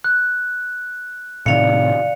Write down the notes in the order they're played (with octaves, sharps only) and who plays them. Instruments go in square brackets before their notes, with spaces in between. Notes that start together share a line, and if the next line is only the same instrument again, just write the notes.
[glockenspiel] F#6
[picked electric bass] A2 C3 D#3 [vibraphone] D5 F5 [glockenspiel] C#7 F7